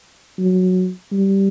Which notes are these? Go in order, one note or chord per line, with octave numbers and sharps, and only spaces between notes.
F#3
G3